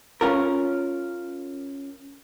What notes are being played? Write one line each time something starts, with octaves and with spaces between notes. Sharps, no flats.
C#4 F4 A#4